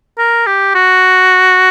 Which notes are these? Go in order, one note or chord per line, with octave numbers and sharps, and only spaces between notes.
A#4
G4
F#4